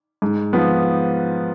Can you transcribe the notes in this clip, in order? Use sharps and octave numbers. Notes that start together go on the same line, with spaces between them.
G#2
F3 B3